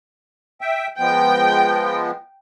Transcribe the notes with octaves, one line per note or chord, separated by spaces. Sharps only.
E5 G5
F3 G#3 B3 G5